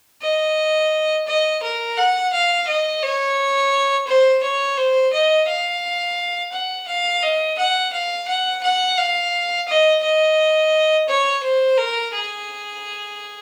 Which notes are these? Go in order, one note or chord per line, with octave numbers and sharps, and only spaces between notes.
D#5
D#5
A#4
F#5
F5
D#5
C#5
C5
C#5
C5
D#5
F5
F#5
F5
D#5
F#5
F5
F#5
F#5
F5
D#5
D#5
C#5
C5
A#4
G#4